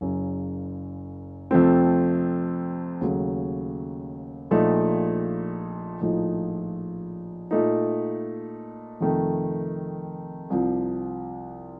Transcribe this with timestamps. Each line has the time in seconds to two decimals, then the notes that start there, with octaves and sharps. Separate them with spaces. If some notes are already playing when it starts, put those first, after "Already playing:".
0.01 F#1 F#2 C#3
1.51 F2 C3 F3 A3 C4
3.01 D#2 C#3 F#3 A3
4.51 A#1 A#2 A3 D#4
6.01 A#1 A2 F3 A3 D#4
7.51 A#2 A3 D#4
9.01 F2 C3 D#3 A3
10.50 C2 C3 F3